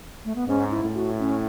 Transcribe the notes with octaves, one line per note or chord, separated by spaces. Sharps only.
A3
B3
G#2 C#4
E4
A2
F#4
C#4